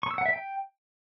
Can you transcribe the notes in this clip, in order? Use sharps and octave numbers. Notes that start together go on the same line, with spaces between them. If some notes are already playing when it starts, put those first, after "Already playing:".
C#6
E6
F#5
E5
G5